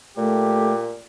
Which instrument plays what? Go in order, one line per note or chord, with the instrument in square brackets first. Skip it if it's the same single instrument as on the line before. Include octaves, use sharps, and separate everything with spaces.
[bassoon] A#2 [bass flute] A3 [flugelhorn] G4